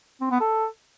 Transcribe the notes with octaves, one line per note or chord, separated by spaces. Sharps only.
C4
B3
A4